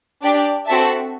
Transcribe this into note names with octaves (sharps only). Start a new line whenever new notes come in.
D4 G4 D5
C4 F#4 A4 E5 A5